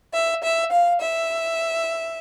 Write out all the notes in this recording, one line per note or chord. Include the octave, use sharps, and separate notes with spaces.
E5
E5
F5
E5